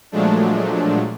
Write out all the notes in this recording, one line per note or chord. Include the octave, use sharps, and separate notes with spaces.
A#2 F3 F#3 G#3 A3 D4